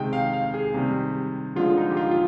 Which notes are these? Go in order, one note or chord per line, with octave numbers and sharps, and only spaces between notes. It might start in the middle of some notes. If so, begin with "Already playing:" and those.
Already playing: C3 D#3 G#3 G5
F5
F5
G#4
C3 D#3 G3
D3 F3 G#3 F4
D#4
G4
F4
F4